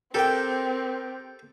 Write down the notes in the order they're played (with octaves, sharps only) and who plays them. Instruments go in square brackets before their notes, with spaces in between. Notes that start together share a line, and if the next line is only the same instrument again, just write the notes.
[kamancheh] C4 [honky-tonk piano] G4 A#4 [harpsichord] A4 G5